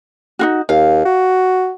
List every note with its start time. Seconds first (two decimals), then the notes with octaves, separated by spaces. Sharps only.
0.39 D#4 F4 F#4
0.69 D#2 F5
1.05 F#4